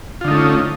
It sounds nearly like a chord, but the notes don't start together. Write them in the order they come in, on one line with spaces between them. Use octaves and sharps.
F4 D3 D#4 A3 C#4